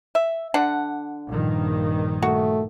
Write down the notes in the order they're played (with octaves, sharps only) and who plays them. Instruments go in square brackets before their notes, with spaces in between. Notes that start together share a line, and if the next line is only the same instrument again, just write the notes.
[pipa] E5
D3 D4 F#5
[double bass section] A#1 G2 D#3
[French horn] A3 [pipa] F#4